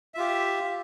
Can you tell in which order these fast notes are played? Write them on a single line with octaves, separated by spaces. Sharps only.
E5 F4 G4